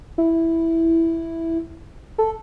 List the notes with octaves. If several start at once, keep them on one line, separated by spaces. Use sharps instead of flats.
E4
A4